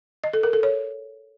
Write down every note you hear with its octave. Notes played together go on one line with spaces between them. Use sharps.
D#5
A4
A#4
A4
C#5